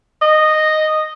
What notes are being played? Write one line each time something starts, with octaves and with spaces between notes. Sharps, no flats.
D#5